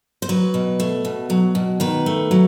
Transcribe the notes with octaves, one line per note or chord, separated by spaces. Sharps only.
C5
F#3 B4
B2
A3
B2
F#3
B2
D#3 B4
A3
F#3